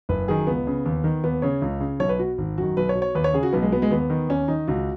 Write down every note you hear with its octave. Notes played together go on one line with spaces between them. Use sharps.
F#1 B4
F#2 D#3 G#4
C#2 B3
C#3
D#2
D#3
D#2 B3
C#3 C#5
C#2
C#3
B1 C#5
B4
B2 F#4
G#1
F#2 D#3 F#4
B1 B4
C#5
B2
C#5
D#2 B4
C#5
C#3 G#4
F#4
B1 B3
G#3
B2 B3
G#3
D#2 B3
D#3
D#2 C#4
D#3 D#4
C#2 F#4